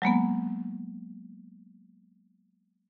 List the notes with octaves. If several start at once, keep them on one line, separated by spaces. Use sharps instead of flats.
F#3 G#3 A#3 B3